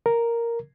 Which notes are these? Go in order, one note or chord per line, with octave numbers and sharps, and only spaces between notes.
A#4